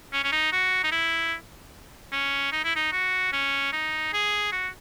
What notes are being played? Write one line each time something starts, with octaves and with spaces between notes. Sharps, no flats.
C#4
C#4
D#4
F#4
D#4
E4
C#4
D#4
E4
D#4
F#4
C#4
D#4
G#4
F#4